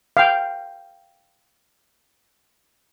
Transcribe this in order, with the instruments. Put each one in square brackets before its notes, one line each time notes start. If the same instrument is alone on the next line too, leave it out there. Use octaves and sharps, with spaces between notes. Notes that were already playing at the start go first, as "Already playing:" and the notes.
[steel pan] F5 G5